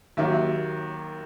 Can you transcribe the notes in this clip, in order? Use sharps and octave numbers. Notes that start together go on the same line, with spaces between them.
D#2 D#3 F#3 A#3 E5